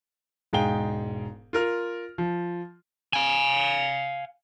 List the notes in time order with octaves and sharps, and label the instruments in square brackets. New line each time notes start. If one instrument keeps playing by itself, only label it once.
[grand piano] E1 G#2 G#4 F5 G5 G7
F4 A#4 F6
F3
[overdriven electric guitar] F5 G#5